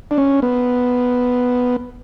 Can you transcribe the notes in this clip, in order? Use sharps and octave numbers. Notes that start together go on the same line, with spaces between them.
D4
C#4
B3